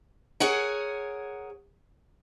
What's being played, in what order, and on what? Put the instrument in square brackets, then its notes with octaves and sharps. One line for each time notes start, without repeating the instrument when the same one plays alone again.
[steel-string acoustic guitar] G#4 A#4 C#5 F#5 G#5